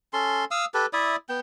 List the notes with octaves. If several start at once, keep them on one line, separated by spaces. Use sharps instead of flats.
C#4 A4 C6
F5 D#6 E6
G4 A4 B4
E4 D5 E5 D#6
B3 G5